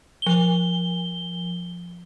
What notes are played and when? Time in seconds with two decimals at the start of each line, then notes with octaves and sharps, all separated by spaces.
0.22 F3 G7